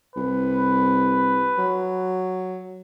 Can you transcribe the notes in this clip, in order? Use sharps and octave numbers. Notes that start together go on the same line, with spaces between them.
C2 B4
F#3